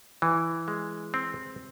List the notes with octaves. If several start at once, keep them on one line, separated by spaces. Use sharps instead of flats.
E3
G#3
C4